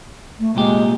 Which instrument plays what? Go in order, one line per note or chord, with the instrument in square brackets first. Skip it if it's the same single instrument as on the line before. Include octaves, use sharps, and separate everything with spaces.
[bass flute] A3
[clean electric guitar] C2 A#2 G4 [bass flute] G#3